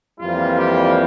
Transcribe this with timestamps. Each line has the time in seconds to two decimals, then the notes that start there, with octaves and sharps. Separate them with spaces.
0.19 F2 E3 G3 A#3 F4
0.59 G4